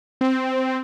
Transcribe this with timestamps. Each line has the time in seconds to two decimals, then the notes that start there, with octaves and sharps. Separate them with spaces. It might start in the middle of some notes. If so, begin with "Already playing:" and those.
0.21 C4